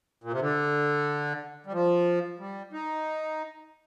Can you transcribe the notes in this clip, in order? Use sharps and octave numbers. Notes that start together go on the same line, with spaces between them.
A#2
C3
D3
G3
F3
G3
D#4